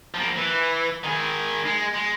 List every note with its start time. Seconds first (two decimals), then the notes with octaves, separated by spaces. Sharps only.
0.14 F3 A#3
0.37 E3
1.04 D#3 G#4
1.66 G#3
1.94 G#3